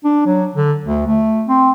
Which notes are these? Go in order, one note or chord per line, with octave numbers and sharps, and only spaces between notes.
D4
F#3
D3
D2
A3
C4